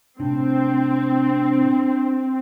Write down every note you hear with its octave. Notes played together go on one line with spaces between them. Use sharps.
A2 C3 C4 D4